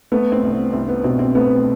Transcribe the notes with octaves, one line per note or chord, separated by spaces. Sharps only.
A3 B3
C4
C2
B3
C2 C4
B3
B2 C4
C4
A3 B3